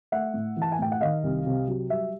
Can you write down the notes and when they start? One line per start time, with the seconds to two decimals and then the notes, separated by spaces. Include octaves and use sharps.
0.12 A3 E5 F#5
0.34 A2
0.57 E3
0.62 A5
0.72 G#5
0.79 A2 G5
0.92 F#5
1.01 D#3 D#5 F5
1.23 C2
1.46 C3
1.68 F#3
1.90 G3 E5